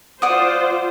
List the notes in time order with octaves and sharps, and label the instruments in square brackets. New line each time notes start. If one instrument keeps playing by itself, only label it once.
[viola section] F4 C5 [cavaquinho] D5 F#5 D#6